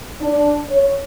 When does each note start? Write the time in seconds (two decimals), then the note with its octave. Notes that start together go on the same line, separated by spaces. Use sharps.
0.21 D4
0.69 C#5